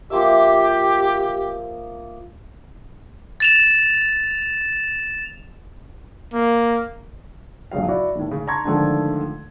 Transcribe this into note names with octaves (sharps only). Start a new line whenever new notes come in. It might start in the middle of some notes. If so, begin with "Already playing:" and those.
F3 A#3 G4 E5
A6 E7 F7
A#3
A#1 G2 C#3 F#3 F5
E4 F#4 D5
D#2 A2
C#3
A5 A#5 C6 C#6 G#6
G#2 D3 D#3 F3 A3 D4